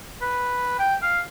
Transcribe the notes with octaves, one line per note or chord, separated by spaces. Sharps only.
B4
G5
F5